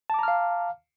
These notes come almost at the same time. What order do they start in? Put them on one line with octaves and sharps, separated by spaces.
A5 D6 A#5 F6 F5